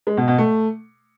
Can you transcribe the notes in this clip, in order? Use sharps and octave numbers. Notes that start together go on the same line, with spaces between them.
G#3
B2
B2
A3